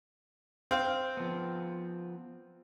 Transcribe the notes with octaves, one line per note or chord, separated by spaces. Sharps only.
C4 F5
F3 B3